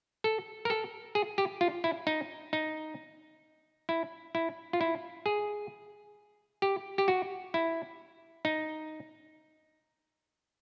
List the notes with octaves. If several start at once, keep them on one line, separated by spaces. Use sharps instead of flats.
A4
A#4
A4
G#4
G4
F4
E4
D#4
D#4
E4
E4
F4
E4
G#4
G4
G4
F#4
E4
D#4